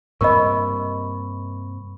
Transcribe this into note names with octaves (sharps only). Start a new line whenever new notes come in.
G2 C3 A#3 A#4 D#5 B5 C#6